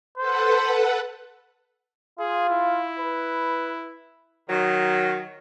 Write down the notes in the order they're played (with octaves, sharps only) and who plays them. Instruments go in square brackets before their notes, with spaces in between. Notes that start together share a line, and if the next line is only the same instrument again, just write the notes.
[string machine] A4 B4 F#5 [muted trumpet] C5
[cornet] F4 [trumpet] G#4
[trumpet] E4
[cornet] B4
[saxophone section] D#3 F#3